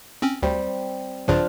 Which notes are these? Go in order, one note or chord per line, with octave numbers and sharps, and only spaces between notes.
C4 C#4
D2 G3 C4
A#1 G2 C#3 F3 D4 F4